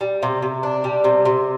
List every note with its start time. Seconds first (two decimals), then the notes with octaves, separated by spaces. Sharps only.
0.01 G3
0.23 C3
0.42 C3
0.63 D4
0.84 G3
1.04 C3
1.25 C3